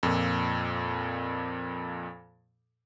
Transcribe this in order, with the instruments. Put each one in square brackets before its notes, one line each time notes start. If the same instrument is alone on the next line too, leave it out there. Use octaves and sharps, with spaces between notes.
[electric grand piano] F2 A#2